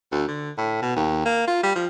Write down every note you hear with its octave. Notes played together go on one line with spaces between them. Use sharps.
D2
D3
A2
B2
D#2
A#3
F4
G3
F3